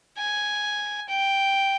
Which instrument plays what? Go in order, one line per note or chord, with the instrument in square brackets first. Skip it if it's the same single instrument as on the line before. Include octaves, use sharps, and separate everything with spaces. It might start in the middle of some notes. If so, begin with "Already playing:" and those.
[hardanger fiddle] G#5
G5